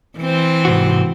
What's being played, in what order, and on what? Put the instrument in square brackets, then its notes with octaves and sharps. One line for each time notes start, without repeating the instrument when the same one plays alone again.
[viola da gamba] E3 C4 C5
[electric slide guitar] G#2 C3 F#4